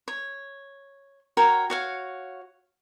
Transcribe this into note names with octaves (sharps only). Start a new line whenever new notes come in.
C#5
F#4 A#4 C#5 G5
F#4 C#5 F5